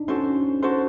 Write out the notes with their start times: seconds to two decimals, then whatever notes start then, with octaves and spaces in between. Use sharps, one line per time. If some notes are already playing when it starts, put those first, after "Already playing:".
Already playing: D4 D#4
0.08 C#4 F#4 A4 C5
0.62 F#4 A4 C5